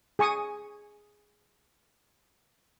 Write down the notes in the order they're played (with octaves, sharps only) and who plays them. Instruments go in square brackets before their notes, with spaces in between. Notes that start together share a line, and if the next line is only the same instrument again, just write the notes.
[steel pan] G#4 G#5 C#6 D#6